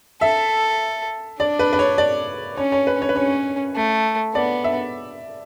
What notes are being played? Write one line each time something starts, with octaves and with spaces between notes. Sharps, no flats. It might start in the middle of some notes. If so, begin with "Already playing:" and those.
A4 E5
D4 D5
B4
B4
C#5
D5
C#4 C#5
C#5
B4
C#5
B4
C#4 C#5
A3
B3 D5
E5